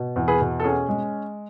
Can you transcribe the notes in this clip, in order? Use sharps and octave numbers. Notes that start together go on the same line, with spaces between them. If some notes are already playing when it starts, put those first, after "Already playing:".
Already playing: B2
E2
G#4 B4
B2
A4
C#4 G#4
G#3